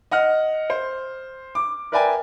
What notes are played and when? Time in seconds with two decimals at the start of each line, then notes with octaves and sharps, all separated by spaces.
0.11 D#5 F#5 F6
0.70 C5
1.55 D6
1.92 A#4 B4 D5 E5 G5 G#5